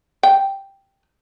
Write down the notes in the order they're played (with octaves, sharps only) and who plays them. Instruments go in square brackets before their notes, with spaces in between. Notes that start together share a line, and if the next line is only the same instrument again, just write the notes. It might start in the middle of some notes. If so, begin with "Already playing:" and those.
[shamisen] G5